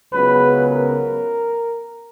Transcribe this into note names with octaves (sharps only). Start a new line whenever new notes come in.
C#2 C#3 F#3 B3 B4
A#4